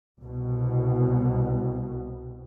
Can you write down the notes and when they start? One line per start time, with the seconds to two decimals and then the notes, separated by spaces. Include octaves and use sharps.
0.21 C2 B2